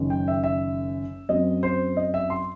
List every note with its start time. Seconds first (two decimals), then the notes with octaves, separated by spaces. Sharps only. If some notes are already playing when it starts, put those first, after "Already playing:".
Already playing: F#1 F#2 D#3
0.10 G5
0.28 E5
0.44 E5
1.29 F#2 F#3 C4 D#5
1.63 C5
1.97 D#5
2.14 E5
2.30 C6